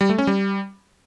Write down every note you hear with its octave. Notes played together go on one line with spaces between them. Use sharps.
G3
A3
C#4
G3